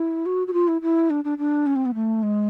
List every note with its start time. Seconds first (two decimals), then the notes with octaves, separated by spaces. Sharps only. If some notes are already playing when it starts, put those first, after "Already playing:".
Already playing: E4
0.26 F#4
0.47 F#4
0.53 F4
0.68 E4
0.82 E4
1.10 D4
1.24 D4
1.38 D4
1.66 C#4
1.76 C4
1.86 B3
1.95 A3
2.23 G#3